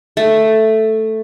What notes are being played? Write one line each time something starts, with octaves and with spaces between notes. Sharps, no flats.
A3